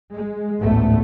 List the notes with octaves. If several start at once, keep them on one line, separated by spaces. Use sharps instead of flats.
G#3
A1 D2 G#2 A3 B3